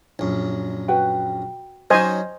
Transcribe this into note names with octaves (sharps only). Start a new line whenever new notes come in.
A#1 F#2
F#4 B4 G5
F#3 C#4 D#4 C5 D#5 G#5